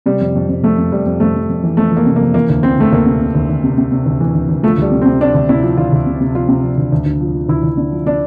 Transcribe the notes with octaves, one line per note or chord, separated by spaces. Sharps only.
C3 G3
F2
F2
F2
F2 A3
F2
F2 G3
F2
F2 A3
F2
F2
E3
F2 A3
E3
A#3
C3
A#3
F2
E3 A#3
D2
E3 C4
D2 A3
D2 A#3
C3
C3
D2
D2
C3
C3
C3
D2
E3
D2
D2
F3 A3
D2 G3
C3
C4
C3
C3 D4
D2
C3 E4
F3
D2 F4
D2
C3
C3
F3 F4
C3
F3
D2
D2
D2
F3
F3
D2 E4
D2
D3
F3
D3 D4